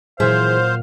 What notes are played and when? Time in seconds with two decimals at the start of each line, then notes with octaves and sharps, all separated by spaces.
0.20 A#2 E3 F#3 G#4 C5 E5 F5